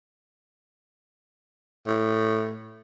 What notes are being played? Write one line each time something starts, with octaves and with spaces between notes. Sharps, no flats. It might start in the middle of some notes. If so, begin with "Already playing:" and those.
A2